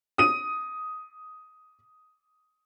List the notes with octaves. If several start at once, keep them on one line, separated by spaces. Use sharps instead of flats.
D#6 D#7